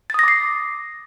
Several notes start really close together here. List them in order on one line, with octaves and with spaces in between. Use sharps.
A6 D#6 A#6 D6 C7